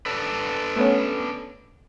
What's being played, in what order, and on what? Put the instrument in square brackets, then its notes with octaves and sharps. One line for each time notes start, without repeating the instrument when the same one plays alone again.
[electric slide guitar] D4 A4 B4
[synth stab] A3 B3 C#4